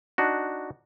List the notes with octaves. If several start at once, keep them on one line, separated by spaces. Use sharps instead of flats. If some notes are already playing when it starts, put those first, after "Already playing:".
D4 D#4 F#4